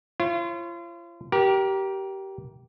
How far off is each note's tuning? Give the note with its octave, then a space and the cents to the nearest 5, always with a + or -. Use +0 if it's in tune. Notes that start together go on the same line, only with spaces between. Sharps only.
F4 -40 C#5 -45
G4 -20 A#4 +20